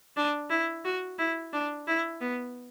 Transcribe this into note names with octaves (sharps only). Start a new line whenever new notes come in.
D4
E4
F#4
E4
D4
E4
B3